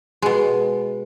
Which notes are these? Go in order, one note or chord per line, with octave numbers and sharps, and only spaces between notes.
B2 G#3